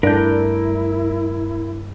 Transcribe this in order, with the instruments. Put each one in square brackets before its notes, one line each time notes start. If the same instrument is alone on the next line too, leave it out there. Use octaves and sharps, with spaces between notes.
[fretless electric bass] G2 A3 [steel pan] D4 [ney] E4 [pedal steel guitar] A#4 G6